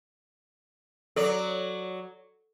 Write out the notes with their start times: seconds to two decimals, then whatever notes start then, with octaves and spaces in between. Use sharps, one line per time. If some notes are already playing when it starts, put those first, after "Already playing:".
1.16 F#3 A4 D5